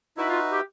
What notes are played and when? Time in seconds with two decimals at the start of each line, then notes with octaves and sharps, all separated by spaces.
0.17 D#4 E4 F#4 B4 E5
0.29 F4
0.52 G4